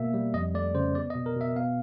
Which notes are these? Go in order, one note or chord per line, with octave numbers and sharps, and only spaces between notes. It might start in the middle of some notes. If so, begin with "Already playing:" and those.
Already playing: B2 A#3 E5
G3
F2 D#5
A3 D5
C#3 C5
B3 D5
D#5
B2
A#4
B2 E5
B3 F5